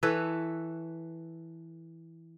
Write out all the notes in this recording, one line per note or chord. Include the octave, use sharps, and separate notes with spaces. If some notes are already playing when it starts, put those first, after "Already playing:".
E3 A4 B4 C#5